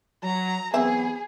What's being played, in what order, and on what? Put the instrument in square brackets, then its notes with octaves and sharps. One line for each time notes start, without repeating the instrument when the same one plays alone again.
[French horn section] F#3 [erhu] A#5
[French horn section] E3 F#3 B3 [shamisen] C4 E5 [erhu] G#4